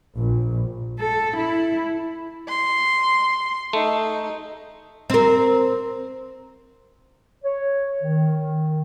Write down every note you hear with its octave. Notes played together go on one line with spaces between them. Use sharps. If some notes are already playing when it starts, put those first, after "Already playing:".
A#1
A4
E4
C6
A3 D#4
C4 A#4
C#5
D#3